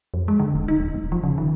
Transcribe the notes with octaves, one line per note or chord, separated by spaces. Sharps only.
F2
G#3
D3
E1
D#4
D#1
E1
F3
C#3
D#3